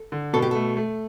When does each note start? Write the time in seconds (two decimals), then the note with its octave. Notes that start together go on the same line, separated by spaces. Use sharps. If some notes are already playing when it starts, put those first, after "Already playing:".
Already playing: A4
0.12 D3
0.33 B2 A4
0.42 G4
0.51 A3 A4
0.77 A3